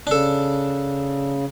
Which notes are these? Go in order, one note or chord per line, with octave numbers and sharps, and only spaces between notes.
C#3 D4 A4